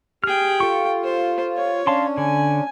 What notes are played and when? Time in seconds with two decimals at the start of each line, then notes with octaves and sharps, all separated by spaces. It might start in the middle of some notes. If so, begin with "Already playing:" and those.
0.24 G4 G#4 G5 F6
0.60 F4 A4 C#6
1.04 C5
1.56 C#5
1.87 C#4 D4 F5 A5 C6
2.18 D3 G#5